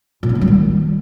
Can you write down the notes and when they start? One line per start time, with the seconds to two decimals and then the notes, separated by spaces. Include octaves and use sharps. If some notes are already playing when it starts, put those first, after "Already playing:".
0.23 A#2
0.29 C#4
0.35 F#3
0.41 G3
0.48 D#3